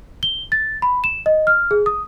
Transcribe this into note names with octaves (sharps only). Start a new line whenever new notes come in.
G7
A6
B5
E7
D#5
F6
G#4
D#6